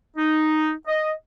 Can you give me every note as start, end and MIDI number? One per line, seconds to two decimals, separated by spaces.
0.17 0.71 63
0.87 1.10 75